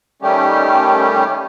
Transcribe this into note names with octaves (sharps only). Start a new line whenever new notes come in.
D#3 G3 A3 C#4 G4